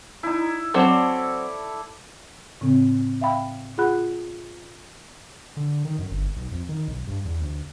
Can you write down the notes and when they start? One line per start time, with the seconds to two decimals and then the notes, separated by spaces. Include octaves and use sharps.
0.23 D#4 E4
0.74 F#3 C4 A4 D5 E5
2.61 A2 C#3 C4
3.21 E5 F5 G5 B5
3.78 F4 G#4 F#5 B5 F#6
5.57 D3
5.85 D#3
5.99 F#2
6.11 G1
6.37 B1
6.52 F2
6.69 D#3
6.88 B1
7.07 G2
7.25 E2
7.40 D2